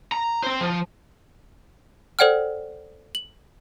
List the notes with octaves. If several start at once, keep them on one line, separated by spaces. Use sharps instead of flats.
A#5
C4 C5
F3
A4 C5 D5 F#5 G5 F6
F#7